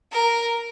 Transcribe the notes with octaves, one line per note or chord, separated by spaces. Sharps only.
A#4